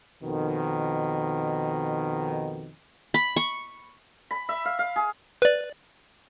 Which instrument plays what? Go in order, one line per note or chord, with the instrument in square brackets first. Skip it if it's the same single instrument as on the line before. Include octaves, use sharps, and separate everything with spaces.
[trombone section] F2 B2 D#3
[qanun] B5
C#6
[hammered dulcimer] B5
E5
F5
F5
G#4
[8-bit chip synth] B4 D5